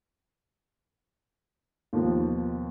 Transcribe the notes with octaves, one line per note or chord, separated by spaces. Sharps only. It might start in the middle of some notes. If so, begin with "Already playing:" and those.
D#2 B2 D#3 F3